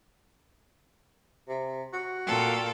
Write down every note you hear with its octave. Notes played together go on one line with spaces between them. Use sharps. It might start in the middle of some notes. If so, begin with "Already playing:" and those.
C3
F#4
A#2 A4 G5